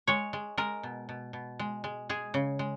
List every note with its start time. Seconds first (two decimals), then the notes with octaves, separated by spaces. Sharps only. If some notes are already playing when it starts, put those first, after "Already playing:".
0.07 G#3 C#5
0.33 G#3
0.58 G#3 A#4
0.83 B2
1.09 B2
1.33 B2
1.59 G#3
1.84 G#3
2.09 G#3 G#4
2.34 C#3
2.59 G#3